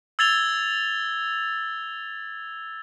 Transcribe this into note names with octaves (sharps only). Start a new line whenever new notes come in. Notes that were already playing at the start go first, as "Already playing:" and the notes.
E6 G#6 A6 F7 G7